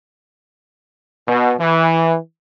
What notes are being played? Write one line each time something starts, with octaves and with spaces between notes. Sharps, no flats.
B2
E3